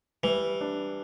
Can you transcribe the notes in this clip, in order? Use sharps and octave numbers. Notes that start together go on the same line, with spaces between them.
E3 G3
D4